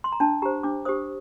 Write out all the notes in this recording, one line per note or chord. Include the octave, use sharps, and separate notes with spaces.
C6
A#5
D4 A5
G4 C5 A#5
D4 D6
G4 C5 D#6